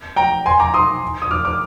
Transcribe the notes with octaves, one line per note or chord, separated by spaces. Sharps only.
G5 A#5
G#5 C6
A#5 D6
C6 D#6
D#6
D6 F6
D6 F6